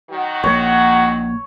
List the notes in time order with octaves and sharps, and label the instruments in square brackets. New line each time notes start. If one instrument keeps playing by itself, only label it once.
[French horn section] D#3 F#3 F#4
[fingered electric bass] A#1 A#3 [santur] C#5